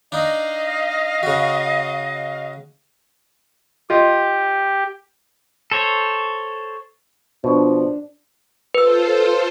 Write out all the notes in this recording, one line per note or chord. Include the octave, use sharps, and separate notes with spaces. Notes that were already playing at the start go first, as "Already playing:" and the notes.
D4 D#4 D#5 F5
C#3 F#4
F4 G4 D#5
A4 C5 C#5
B2 F3 D4
F4 A4 B4 C5 E6